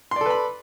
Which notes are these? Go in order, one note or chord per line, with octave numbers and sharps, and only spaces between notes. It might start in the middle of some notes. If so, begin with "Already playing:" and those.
A4 B4 D5 B5 C6